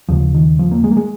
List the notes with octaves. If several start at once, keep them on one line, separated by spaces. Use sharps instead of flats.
D#2 C#3 F3
D#3
F3
A#3
G#3
A#3
G#3